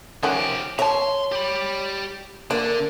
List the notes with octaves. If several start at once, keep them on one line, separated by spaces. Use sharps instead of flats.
D#3 F3 C#4 F#4 G4
C#5 E5 A5 A#5 C6
G4 B5
D3 A#3 D4 D5